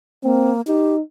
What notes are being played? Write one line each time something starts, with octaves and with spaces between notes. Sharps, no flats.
A#3 C4
D#4 G4